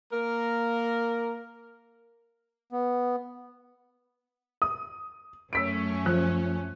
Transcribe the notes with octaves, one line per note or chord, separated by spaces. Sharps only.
A#3 A#4
B3
D#6
F#2 A3 C#4 E6 B6 D7
F3 F#6